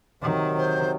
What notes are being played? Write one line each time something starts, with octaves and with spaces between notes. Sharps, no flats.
C3 D#3 F#3
C5